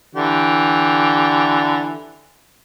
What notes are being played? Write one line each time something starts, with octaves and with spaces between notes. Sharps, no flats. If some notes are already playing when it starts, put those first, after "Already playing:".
D3 E3 G4